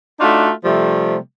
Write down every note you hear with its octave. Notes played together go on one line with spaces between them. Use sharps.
A3 D4 D#4 F4 F#4
C3 F3 G3 A3